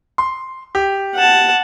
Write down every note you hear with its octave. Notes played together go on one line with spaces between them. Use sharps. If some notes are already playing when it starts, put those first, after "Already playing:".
C6
G4
F#5 A5